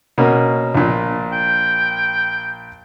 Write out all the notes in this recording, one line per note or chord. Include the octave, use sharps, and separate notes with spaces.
B2 A#3 C#4
A#1 A#2
G5